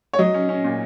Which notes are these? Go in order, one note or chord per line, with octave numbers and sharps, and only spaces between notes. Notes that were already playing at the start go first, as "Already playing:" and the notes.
C#5
F#3 D#5
C#4
C#4
A#2